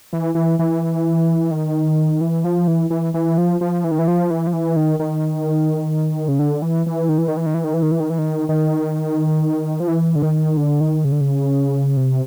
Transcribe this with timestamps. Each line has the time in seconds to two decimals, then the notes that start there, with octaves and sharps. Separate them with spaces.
0.13 E3
0.35 E3
0.59 E3
1.51 D#3
2.21 E3
2.44 F3
2.68 E3
2.90 E3
3.14 E3
3.38 F3
3.61 F3
3.84 E3
3.91 D#3
3.99 E3
4.08 F3
4.30 E3
4.47 F3
4.53 E3
4.76 D#3
4.99 D#3
6.28 C#3
6.39 D3
6.62 E3
6.86 E3
7.09 D#3
7.18 E3
7.28 D#3
7.37 E3
7.46 D#3
7.54 E3
7.64 D#3
7.74 E3
7.82 D#3
7.91 E3
8.00 D#3
8.10 E3
8.18 D#3
8.49 D#3
9.80 F3
9.88 E3
10.15 D3
10.22 D#3
10.57 D3
10.81 D#3
11.05 C#3
11.12 D3
11.21 C#3
11.97 C3